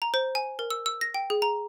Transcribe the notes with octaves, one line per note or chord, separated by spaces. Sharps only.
A#5
C5
G#5
A#4
E6
E6
A#6
G5
G#4
A#5